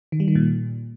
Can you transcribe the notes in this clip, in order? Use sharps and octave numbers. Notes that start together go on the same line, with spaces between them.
D#3
G3
D#3
A#2